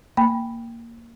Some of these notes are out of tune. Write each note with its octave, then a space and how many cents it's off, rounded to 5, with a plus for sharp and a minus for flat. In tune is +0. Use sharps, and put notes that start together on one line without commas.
A#3 -10 G5 +0 B5 +0